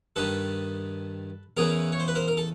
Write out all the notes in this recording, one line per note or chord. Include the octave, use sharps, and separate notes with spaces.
G2 D#3 A4 B4
E2 C#3 E3 G#4 A#4
C#5
C5
B4
A#4 C5
A#4
A4